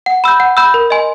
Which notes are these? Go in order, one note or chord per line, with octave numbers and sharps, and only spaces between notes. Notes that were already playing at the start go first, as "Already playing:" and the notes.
F#5
B5 E6 G6
F#5
B5 E6 G6
A#4
D#5 G#5 C6